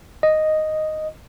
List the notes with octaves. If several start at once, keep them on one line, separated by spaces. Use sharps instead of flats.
D#5